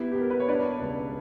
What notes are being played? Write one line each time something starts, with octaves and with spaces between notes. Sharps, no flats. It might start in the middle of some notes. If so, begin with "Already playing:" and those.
Already playing: B3 E4 G4
B3 G4
A#4
B4
C#5
D4 B4 D5
C#2